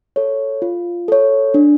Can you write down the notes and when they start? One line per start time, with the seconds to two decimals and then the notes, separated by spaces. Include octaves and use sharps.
0.16 A4 C#5
0.62 F4
1.08 A4 C#5
1.54 D4